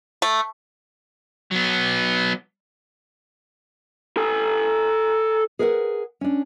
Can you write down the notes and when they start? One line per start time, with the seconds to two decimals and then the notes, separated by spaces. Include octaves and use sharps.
0.22 A3
1.51 F#3 B3
4.17 A4 G#5
5.59 G#4 A#4 B4 F5 F#5
6.21 C#4 D4